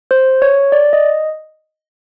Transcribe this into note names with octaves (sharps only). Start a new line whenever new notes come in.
C5
C#5
D5
D#5